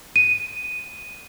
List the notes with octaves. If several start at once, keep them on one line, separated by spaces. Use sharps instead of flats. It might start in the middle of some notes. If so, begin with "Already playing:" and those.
D#7